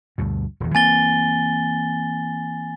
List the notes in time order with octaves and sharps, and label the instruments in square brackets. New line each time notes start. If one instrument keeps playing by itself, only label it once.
[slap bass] D2 G2 B2
D#1 E2
[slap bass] E3 A#3 C4 [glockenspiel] G#5 A6 G7